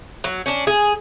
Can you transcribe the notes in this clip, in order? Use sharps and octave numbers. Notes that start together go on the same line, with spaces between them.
F#3
C#4 D4
G#4